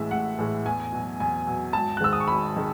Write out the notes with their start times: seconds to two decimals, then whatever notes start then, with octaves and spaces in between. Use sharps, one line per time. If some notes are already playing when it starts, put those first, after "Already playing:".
Already playing: A1 A2 E3 G#3 E5
0.11 A1 F#5
0.39 A2 E3 G#3
0.65 E2 G#5
0.93 B2 F#3
1.20 E2 G#5
1.47 B2 F#3
1.73 G#1 A5
1.97 F#6
2.00 G#2 D#3 G#3 E6
2.13 D#6
2.20 C#6
2.28 G#1 B5
2.57 D#3 G#3